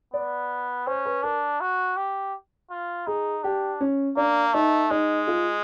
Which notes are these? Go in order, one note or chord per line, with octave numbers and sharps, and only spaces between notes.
B3 D5
C#4 C5
B4
D4 A#4
F#4
G4
F4
D#4 G#4
D4 G4
C#4
A#3 D4
A3 D#4
G#3 D#4
F4